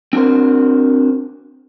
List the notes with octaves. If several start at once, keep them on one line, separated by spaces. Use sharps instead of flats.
C4 D4 F#4 A#4 C5